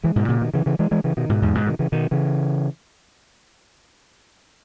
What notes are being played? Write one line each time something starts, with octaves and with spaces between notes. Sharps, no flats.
E3 G#3
G#2 B2
A#2 C#3
B2 D#3
C#3 E3
C#3 E3
E3 G#3
E3 G#3
C#3 E3
B2 D#3
G#2 B2
E2 G#2
G#2 B2
B2 D#3
C#3 E3
B2 D#3
C#3 E3